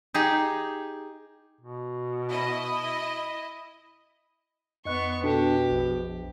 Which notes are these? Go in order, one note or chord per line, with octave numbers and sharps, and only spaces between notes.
D#4 G4 G#4
B2
E4 D#5
F2 B3 D#5 C#6 F#6
B2 D4 G4 A4
A#1